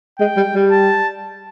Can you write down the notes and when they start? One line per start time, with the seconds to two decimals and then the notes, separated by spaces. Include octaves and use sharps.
0.19 G#3 G5
0.36 G3
0.55 G3
0.72 A5